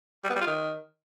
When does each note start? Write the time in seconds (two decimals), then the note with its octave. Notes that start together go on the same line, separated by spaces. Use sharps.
0.24 G3
0.30 B3
0.35 G3
0.41 F4
0.47 D#3